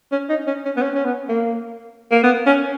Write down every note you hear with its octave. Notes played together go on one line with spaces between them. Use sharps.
C#4
D#4
C#4
C#4
B3
C#4
C#4
B3
A#3
A#3
B3
C#4